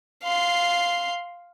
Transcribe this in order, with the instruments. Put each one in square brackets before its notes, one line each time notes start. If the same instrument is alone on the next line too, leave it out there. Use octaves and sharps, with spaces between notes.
[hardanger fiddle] F5 C6